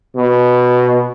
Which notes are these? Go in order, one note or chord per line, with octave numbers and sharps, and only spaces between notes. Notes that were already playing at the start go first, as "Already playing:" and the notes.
B2